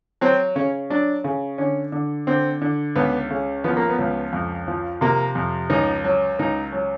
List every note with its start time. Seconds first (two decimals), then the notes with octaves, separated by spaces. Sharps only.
0.21 F#3 C4
0.56 C#3 C#4
0.90 F#3 D4
1.24 C#3
1.58 D3 C#4
1.92 D3
2.27 D3 C4
2.62 D3
2.96 C#2 B3
3.31 C#3
3.64 F3 B3
3.77 A#3
3.89 B3
3.98 C#2
4.33 F2
4.68 F3
5.01 C3 A#3
5.35 F2
5.70 C#2 D#4
6.04 F#3
6.39 C#2 D#4
6.72 F#3